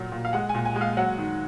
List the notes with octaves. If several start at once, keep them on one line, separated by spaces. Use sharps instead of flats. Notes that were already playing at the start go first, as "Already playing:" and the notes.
Already playing: A#2 F#3
A#2
F5
G#3 F#5
G#5
A#2
G#5
G#3
F5
F#3 F#5
D#3